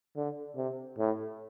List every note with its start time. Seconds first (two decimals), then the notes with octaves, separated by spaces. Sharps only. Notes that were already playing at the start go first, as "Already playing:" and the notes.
0.17 D3
0.57 C3
0.99 A2